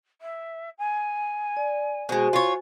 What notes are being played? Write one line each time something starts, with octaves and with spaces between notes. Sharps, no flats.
E5
G#5
D5
B2 G#3 F#4 C5 G#5
F4 C#5